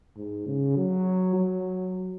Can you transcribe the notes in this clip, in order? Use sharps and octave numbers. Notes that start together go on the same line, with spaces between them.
G#2
C#3
F#3
F#3